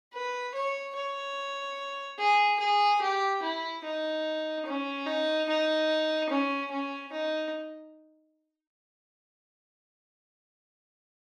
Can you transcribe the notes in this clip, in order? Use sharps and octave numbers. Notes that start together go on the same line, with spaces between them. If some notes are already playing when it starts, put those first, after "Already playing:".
B4
C#5
C#5
G#4
G#4
G4
E4
D#4
C#4
D#4
D#4
C#4
C#4
D#4